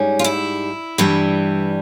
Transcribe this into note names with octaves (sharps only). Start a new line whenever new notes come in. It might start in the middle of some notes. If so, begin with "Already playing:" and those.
Already playing: G#2 G3 C#4
F4
E4
G2 E3 G3